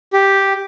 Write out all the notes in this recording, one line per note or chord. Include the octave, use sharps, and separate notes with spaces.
G4